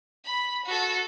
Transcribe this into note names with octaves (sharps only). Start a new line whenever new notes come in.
B5
F#4 A4